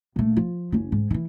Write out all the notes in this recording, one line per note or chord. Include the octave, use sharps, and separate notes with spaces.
A#1 A3
F3 F4
F#1 C#4
G#2
D#3 E3